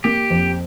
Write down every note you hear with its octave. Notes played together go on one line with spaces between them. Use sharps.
A#3 G4
F2